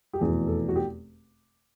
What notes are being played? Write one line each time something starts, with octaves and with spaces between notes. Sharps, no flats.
G4
F1 E2 B2 G#4
A4
F#4
G4